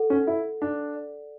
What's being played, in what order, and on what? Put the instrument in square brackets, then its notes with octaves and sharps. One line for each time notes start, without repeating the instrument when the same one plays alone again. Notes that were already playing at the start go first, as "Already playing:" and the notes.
Already playing: [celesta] A4 F#5
[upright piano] C#4
[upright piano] E4 [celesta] A4
[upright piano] D4 [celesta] F#5
[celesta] D5